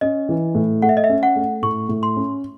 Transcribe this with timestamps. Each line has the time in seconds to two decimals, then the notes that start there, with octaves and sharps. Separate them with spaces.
0.01 C#4 D#5
0.29 E3
0.55 A2
0.82 A3 F#5
0.89 E5
0.97 D#5
1.04 E5
1.09 C#4
1.23 F#5
1.36 A3
1.62 A2 C#6
1.89 A2
2.03 C6
2.16 C#4